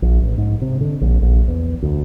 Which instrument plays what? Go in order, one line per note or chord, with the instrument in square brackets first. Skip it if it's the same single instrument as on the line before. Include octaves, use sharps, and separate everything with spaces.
[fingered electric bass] A#1
A1
G#2
C3
D3
A#1
A#1
E2
D2